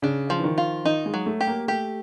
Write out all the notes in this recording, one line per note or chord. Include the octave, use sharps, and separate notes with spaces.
C#3 D4
F3
E3
D#3
F4
D#3 D#4
G#3
F#3
A3
G4
A#3
A3 G4